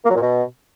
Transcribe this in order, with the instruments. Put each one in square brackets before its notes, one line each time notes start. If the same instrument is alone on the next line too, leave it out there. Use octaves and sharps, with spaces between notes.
[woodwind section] A#3
F#3
A#2
B2